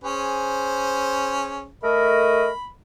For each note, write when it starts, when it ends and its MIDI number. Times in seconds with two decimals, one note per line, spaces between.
0.04 1.68 61
0.04 1.68 68
0.04 1.68 72
1.83 2.48 57
1.83 2.48 70
1.83 2.48 75
1.83 2.69 83